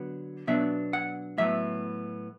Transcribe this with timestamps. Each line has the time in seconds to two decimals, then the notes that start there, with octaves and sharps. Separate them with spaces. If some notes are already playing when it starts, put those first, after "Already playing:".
Already playing: D3 F#3 B3
0.47 B2 F#3 B3 D4 E5
0.93 F#5
1.38 A2 F#3 B3 E5